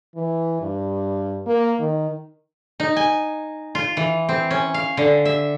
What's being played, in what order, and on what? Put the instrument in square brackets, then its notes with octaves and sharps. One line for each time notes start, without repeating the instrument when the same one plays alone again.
[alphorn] E3
G2
A#3
D#3
[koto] D#4
G#5
F4
E3
C4
C#4
F5
D3
E5